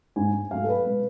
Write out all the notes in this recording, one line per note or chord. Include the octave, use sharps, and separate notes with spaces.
G#2 G#3 G#5
G#2 F#3 A3 F5
A4
B4
B2 G#3